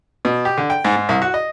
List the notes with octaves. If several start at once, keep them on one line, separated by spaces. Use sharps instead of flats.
B2
G4
D3
G5
G#2
G#2
C2
F#4
D#5